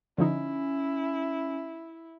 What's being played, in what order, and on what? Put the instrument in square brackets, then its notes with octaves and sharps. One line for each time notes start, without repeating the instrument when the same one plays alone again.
[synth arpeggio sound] D3 F3 D#4 [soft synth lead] C#4 [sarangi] E4